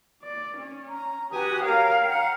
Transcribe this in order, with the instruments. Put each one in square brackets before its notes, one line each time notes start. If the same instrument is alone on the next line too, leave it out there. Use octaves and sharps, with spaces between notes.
[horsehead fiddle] D5
C#4
[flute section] A#5
[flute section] F#4 B4 D#6 [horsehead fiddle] G4 G#5
[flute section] A#4 C#5 G5 [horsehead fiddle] F5
[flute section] F#5 G5 A#5